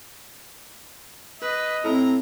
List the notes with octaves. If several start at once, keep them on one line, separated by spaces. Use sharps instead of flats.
B4 D#5
A2 C4 A#5